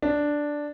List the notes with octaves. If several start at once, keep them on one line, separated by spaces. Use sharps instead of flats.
D4